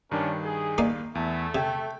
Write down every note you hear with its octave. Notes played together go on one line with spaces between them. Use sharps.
G2 D#3 C#4 D4 A#4
G#4
A#3 D#4 D5
E2 A3
C3 G5 G#6